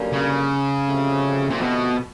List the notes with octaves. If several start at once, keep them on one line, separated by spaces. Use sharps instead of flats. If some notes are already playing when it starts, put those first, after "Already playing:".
Already playing: F#2 D3 G3 A#3 C#4
C#3
D2 C3 F3 A3 C4
A#2
B2